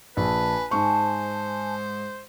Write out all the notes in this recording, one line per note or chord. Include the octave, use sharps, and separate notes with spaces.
A#1 B4 G#5 A5
G#2 C5 C#6